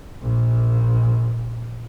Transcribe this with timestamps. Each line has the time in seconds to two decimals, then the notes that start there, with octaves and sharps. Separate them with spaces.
0.22 A#1 A#2